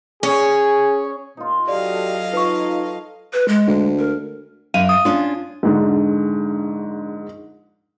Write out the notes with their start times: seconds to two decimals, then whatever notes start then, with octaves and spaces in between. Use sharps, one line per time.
0.23 C#4 G#4 C#5
1.37 A#2 D#4 F4
1.68 F#3 F#4 G4 A4 D5 D#5 F5
2.33 D#4 F4 A4 B4 C#6
3.33 B4
3.48 G#3
3.67 D2
3.99 A#4
4.74 F#2 F5 D#7
4.89 D#6
5.05 C#4 D4 F4
5.63 A#1 G#2 D3